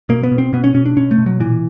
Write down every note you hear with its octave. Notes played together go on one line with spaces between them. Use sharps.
B2 A#3
B3
B2
C4
B2 B3
C#4
B2 C#4
D4
B2 C#4
A3
B2
F#3
A#2 E3